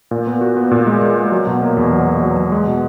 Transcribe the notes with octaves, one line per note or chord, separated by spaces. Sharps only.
A#2
B3
F#4
B3
A#2
G#3
G#3
G#3
F#3
B2
A#3
E2
F#3
A#3
F#3
F#3
G#3
B2